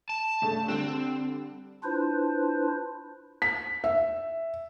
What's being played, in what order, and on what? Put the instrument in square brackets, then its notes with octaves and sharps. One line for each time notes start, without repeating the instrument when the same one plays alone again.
[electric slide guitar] A5
[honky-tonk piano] G2 C#3 A3
[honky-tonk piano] D3 G3 F#6 [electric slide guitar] C4
[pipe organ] D4 E4 F4 B4 C5
[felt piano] B6
E5